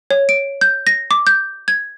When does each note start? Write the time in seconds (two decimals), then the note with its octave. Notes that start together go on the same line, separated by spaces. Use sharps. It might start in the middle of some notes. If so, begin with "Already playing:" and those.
0.11 C#5
0.29 D7
0.61 G6
0.87 A#6
1.11 D6
1.27 G6
1.68 G#6